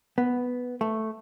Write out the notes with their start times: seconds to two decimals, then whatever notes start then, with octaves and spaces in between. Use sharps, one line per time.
0.18 B3
0.81 A3